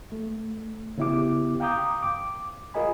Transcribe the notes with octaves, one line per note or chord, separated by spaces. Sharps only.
A3
C#3 B3 E4 G4 D6
F5 G5 A#5 D6 D#6 G6
D6
F4 G#4 A#4 D#5 G#5 B5